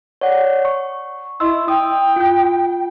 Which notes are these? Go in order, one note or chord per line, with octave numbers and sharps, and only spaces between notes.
C#5 D5 F#5
C#6
E4 D#5 C6 E6
G5 D#6
F4 G6